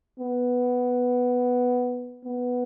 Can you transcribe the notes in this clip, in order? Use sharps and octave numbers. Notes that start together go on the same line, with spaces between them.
B3
B3